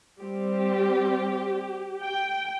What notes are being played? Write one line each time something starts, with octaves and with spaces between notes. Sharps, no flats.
G3 C4 G4
G5